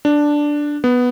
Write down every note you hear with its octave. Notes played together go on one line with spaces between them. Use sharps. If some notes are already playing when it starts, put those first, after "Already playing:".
D4
B3